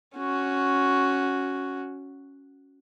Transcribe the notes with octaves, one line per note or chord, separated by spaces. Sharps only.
C#4 F#4